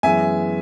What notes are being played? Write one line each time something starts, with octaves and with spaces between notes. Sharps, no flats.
F#2 E3 G#3 B3 E5 G#5